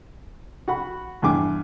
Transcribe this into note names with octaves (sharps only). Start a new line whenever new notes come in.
F#4 F#5 B5
E2 G2 G#5 D6